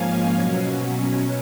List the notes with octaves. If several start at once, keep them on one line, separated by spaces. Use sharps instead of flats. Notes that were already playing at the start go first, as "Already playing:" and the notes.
Already playing: G#2 F3 A#3 C#4 F5 G#5
B2 F#3 C#4